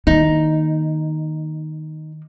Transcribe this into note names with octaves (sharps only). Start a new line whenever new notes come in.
D#3 A#3 D#4